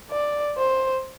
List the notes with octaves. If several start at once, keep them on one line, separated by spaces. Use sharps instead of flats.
D5
C5